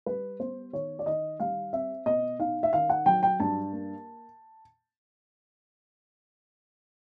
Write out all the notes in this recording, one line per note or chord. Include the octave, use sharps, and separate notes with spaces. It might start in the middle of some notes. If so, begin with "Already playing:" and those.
G3 B4
B3 C5
D#3 C#5
D5
D#3 D#5
G3 F5
C4 E5
B2 D#5
D#4 F5
E5
D#3 F5
F#5
F#3 G5
G5
G2 A5
A#3